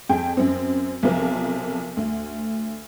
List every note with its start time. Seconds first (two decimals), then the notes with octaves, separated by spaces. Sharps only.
0.09 F2 G#4 G5
0.37 F#2 C4
1.03 B1 C3 F3 A#4
1.97 D2